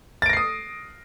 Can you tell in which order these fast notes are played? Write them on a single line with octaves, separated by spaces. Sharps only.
A6 D7 A#6 C7 D#6